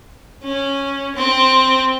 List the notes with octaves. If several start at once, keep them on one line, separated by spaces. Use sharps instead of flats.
C#4
C4